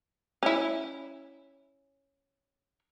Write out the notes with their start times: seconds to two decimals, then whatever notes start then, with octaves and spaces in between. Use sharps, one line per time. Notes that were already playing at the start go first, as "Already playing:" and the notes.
0.43 C#4 E4